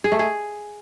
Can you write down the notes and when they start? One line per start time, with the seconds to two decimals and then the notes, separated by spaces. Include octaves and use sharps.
0.04 G#4
0.12 A3
0.19 G#4